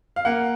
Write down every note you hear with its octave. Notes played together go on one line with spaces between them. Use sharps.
F5
A#3 F#5